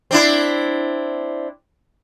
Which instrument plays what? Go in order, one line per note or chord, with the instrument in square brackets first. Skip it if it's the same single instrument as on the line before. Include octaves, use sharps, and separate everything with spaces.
[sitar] C4 D4 E4